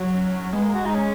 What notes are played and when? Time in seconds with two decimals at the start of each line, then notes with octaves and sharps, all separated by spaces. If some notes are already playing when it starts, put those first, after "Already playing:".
Already playing: F#3
0.10 C#4
0.53 G#3 B3
0.64 A#3
0.74 F#4
0.85 D#4
0.95 C#4